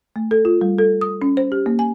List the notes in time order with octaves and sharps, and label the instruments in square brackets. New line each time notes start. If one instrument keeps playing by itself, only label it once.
[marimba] A3
A4
F4
G3
A4
D#6
C#4
C5
G4
A#3
G#5